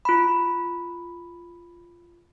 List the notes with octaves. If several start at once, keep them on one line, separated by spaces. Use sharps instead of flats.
F4 B5